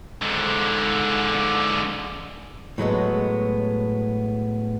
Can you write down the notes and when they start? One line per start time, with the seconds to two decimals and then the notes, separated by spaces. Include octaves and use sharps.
0.22 G#2 D3
2.78 A2 F#3 G#3 B3